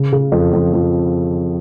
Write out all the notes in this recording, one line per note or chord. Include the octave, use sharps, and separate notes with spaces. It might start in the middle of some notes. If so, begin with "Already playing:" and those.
Already playing: C#3
C#3
F2
F2
F2